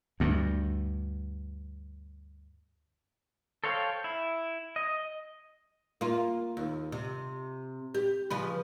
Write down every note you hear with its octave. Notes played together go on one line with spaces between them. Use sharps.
D2 G2
A4 C5 C#5 F5 G5
E4
D#5
A#3 F4
D#2
C3
G4
C#3 F3 B4